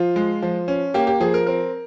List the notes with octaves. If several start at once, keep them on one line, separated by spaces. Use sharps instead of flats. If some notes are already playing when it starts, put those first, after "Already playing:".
Already playing: F3 F4
G#3
F3
C#4
A#3 G4
G4
F3 G#4
A#4
C4 A#4